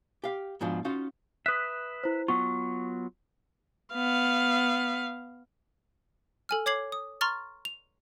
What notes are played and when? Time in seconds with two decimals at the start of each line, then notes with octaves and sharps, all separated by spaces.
0.24 G4 F5
0.61 G#2 B2 F3 D4
0.85 C#4 D#4 F4 F#4 F5
1.46 B4 E5 D#6 F#6
2.04 E4 C5
2.28 F#3 B3 F4 C#6
3.94 B3 F5
6.49 A4 G#5 F6
6.66 C#5 D6 G#6 C7 F#7
6.92 D#6
7.21 A#5 C6 C#6 F6 A6
7.65 F7